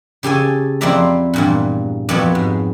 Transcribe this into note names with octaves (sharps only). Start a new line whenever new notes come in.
C#3 G4 A4 G#5
F2 C4 E4 D5 E5 A#5
E2 G2 A#2
F2 F#3 B3 G4 B4 C#5
G#2